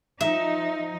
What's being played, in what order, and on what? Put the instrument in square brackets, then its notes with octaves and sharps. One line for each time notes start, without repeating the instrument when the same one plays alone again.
[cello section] F3 D#4 [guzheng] E5